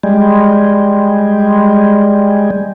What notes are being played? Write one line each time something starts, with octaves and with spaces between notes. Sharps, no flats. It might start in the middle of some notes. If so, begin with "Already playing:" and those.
G3 G#3